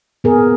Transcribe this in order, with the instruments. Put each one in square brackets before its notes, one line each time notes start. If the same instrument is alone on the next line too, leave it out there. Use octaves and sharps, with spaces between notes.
[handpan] B3 G#4 A#4